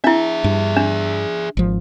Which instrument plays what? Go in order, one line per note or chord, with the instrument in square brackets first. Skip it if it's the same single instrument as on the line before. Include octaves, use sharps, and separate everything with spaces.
[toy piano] D4 E4 [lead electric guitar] G#4 E5
[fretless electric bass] G2
[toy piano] D4
[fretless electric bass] G#1 F3